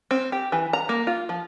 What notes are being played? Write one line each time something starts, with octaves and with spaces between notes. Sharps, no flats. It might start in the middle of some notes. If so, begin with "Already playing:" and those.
C4
G4
E3
A#5
A#3
F4
F3